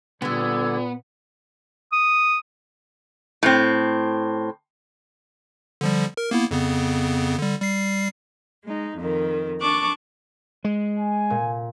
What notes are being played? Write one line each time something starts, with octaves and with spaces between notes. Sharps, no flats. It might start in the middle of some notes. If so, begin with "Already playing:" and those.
A#2 D3 G3 B3 E6 G#6
D#6
A2 C4
D3 F3 G3
A#4
A#3 B3 E4
F2 C#3 B3
D3 G3
G3 C7
G#3 D#4
F2 D#3
D4 A5 C#6 D6 F#6
G#3
G#5
A#2